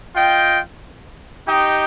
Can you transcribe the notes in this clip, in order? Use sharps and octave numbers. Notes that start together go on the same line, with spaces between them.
F4 D#5 G5
D#4 G4 D#5 G5